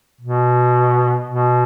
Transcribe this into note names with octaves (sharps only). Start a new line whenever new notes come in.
B2
B2